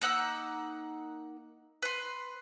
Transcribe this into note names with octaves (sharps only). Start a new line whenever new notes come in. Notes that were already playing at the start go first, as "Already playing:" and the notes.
A#3 D#4 F#5 E6
B4 C6